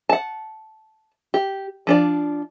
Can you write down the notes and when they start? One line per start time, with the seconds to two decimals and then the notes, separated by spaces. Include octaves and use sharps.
0.09 F#5 A5
1.34 G4
1.87 F3 D4 D5